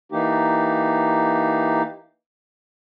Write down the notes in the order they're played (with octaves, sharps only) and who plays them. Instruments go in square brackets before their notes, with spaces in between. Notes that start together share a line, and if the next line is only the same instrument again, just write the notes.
[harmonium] E3 A#3 D#4 G4